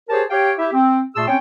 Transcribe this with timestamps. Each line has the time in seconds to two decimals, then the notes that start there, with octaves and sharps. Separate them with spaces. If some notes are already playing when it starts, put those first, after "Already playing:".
0.09 G4 G#4 A#4 C5 C#5 A5
0.30 G4 C#5 F5 G5
0.59 E4 G4 E5
0.72 C4
1.16 A#2 A3 G#4 A5 C6 E6
1.27 C4 C#4 C#5 G5